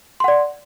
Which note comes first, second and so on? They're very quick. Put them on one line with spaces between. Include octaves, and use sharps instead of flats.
C6 F#5 D5